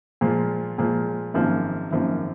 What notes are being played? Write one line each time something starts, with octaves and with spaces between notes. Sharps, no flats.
A#2 F3 G#3
A#2 F3 G#3
G#1 F#2 F3 A#3
G#1 F#2 F3 A#3